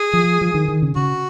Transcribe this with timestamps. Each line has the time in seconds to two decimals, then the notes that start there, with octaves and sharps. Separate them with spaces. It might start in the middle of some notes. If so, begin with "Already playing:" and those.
Already playing: G#4
0.13 F3
0.41 F3
0.54 D#3
0.68 D#3
0.82 C#3
0.96 C#3 F#4